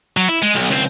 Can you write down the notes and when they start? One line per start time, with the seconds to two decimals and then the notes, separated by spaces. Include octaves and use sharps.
0.17 F#3
0.29 E4
0.43 G#3
0.55 B1
0.71 C#2 C4